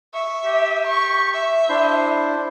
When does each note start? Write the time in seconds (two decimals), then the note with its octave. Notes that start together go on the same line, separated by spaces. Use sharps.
0.14 E5 C#6
0.45 G4
0.87 C#6
1.34 E5
1.69 D4 E4 C5
2.12 C5